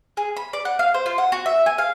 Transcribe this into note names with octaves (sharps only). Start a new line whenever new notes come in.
G#4
B5
D5
F#5
F5
C5
F4
F#5
F#4
E5
G#5
F5